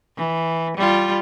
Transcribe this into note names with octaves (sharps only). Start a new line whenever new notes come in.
E3
G3 F4